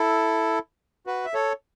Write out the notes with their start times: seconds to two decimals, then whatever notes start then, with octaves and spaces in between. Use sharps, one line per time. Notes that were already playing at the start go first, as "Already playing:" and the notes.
Already playing: E4 A4
1.07 F#4 B4
1.25 E5
1.34 A4 C#5